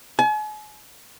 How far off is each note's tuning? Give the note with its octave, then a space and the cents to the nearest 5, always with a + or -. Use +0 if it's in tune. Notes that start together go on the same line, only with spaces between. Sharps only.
G#5 +40